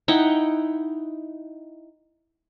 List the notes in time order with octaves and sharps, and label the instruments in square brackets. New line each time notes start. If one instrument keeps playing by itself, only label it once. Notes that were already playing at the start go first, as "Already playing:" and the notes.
[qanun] D#4 E4 F#5 G5